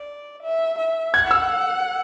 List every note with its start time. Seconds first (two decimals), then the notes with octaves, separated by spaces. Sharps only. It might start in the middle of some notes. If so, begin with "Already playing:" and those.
Already playing: D5
0.43 E5
0.78 E5
1.14 F#5 G#6
1.31 E6